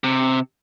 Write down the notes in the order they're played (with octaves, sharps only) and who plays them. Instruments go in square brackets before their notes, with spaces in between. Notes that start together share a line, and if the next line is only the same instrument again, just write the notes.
[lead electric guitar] C3